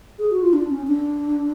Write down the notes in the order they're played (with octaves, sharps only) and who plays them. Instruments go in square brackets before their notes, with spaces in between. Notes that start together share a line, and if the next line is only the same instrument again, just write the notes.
[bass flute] G#4
F#4
F4
D4
C#4
D4